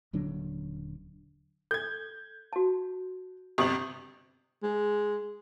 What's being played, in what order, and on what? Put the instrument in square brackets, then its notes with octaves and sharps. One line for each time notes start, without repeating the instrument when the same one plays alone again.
[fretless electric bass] D#1 D3 F#3 D4
[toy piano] A4 [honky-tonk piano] G6 G#6
[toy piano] F#4 A5
[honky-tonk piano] G1 C3 F#7 [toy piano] G4 D#6
[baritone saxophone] G#3